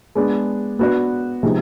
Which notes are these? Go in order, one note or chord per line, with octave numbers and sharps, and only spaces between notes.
G#3 B3 D4
B3 D4 F#4 B4 D5
C3 F3 G#3 B3 D#4